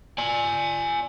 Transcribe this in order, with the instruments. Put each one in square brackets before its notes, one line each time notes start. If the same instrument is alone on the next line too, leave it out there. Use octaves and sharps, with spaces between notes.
[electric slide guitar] D5 G#5